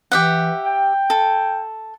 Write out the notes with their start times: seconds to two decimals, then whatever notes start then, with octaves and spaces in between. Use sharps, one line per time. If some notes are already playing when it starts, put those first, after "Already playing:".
0.12 E3 G4 E5 F#5
0.64 G5
1.10 A4